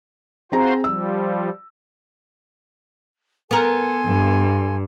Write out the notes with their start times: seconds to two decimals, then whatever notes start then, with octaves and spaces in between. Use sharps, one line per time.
0.52 C4 F4 F#4 G#4 C5 A#5
0.84 F3 G3 E6
3.51 B3 A4 A#4 G#5 C6
4.06 G2